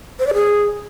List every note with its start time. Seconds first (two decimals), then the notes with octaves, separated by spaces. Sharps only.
0.19 C5
0.27 D5
0.34 G#4